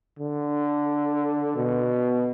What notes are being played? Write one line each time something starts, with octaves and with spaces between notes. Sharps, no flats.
D3
B2